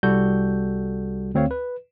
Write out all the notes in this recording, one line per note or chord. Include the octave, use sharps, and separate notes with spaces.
C2 G3 F#4 A4 G6
D2 C4 C#5 F5
B4